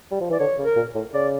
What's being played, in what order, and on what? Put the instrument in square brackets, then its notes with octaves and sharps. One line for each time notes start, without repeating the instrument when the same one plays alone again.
[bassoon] G3
F3
[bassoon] E3 [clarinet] D5
[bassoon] D3 [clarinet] C#5
[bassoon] C#3
[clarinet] A#4
[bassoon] A#2
A2
[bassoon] C#3 [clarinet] D5